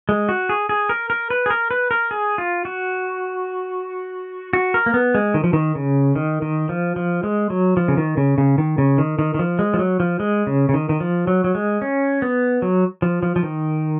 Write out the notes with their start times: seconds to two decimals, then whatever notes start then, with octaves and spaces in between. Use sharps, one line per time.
0.09 G#3
0.29 F#4
0.49 G#4
0.69 G#4
0.89 A#4
1.10 A#4
1.30 B4
1.46 G#4
1.50 A#4
1.71 B4
1.91 A#4
2.11 G#4
2.38 F4
2.65 F#4
4.53 F#4
4.74 A#4
4.86 A#3
4.94 B3
5.15 G#3
5.34 D#3
5.44 F3
5.53 D#3
5.75 C#3
6.15 D#3
6.42 D#3
6.69 F3
6.96 F3
7.23 G#3
7.50 F#3
7.77 F3
7.88 C#3
7.97 D#3
8.17 C#3
8.38 C#3
8.58 D#3
8.78 C#3
8.98 D#3
9.19 D#3
9.34 D#3
9.39 F3
9.59 G#3
9.74 F3
9.79 F#3
10.00 F3
10.20 G#3
10.47 C#3
10.69 C#3
10.74 D#3
10.89 D#3
11.00 F3
11.27 F#3
11.44 F#3
11.55 G#3
11.82 C#4
12.22 B3
12.62 F#3
13.02 F3
13.23 F3
13.36 F3
13.43 D#3